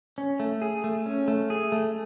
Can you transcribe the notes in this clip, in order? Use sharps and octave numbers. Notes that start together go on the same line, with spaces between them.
C#4
A3
G#4
A3
C#4
A3
G#4
A3